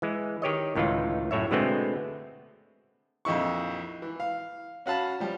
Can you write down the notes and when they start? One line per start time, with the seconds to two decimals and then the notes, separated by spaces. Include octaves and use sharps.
0.02 E3 G#3
0.42 D#3 G4 C#5 D#5
0.75 C#2 A2 D#3 E3 F4
1.31 F#2 A2 C#5 E5
1.51 B2 D3 G#3 A3 B3 C4
3.25 A#1 F2 D#4 E4 C#6
4.02 E3
4.20 F5
4.86 C#4 F#4 F5 A5 B5
5.20 F3 G3